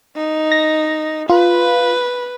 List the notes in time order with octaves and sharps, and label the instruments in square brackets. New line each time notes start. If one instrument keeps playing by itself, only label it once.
[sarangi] D#4
[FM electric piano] A#6
[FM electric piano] F4 [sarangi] B4